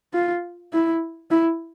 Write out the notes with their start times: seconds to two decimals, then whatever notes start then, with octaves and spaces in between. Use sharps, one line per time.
0.14 F4
0.73 E4
1.31 E4